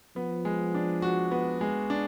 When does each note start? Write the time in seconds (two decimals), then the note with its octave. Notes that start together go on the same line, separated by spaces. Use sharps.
0.16 F3 B3
0.45 G#3
0.74 D4
1.02 F#4
1.31 B3
1.61 G#3
1.90 D4